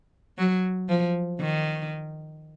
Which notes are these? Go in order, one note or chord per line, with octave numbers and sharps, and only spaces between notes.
F#3
F3
D#3